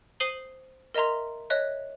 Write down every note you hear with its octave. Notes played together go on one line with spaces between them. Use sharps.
C5 D#6 C7 D#7 F#7 G7
A#4 D#5 E5 A#5 C6
C#5 D#5 E5 F#6